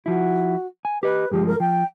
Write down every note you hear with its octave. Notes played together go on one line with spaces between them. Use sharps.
F3 E4 F#4
G#5
G4 B4 D#5
G2 F3 G#3 G4
A#4
F3 G5